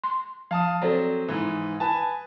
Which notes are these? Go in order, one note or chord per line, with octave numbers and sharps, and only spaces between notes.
C6
F3 F5 A5 D#6
F#3 C4 A4 C5 D5
G#2 E3
B4 G#5 A5